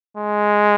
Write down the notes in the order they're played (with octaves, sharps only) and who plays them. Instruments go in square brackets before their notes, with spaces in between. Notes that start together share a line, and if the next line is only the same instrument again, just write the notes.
[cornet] G#3